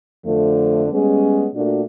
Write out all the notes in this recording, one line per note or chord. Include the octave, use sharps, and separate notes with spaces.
F2 D3 F3 A3
G3 G#3 B3 C#4 G#4
A#2 A3 D4 F#4